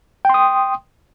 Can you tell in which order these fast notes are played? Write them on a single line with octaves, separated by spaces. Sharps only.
G5 C6 D#6